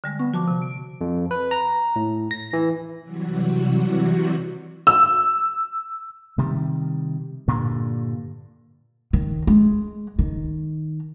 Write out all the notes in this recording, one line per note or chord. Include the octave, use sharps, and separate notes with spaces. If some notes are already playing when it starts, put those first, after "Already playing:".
D3 G3 G#3
B3 C#6
F3 F#4 A5 D6
C3
D7
F2
B4
A#5
A2
A#6
E3
C3 E3 F#3 G3 F#4
E6
C3 D#3 G3
G2 A#2 D3
D#3
G#3
D#3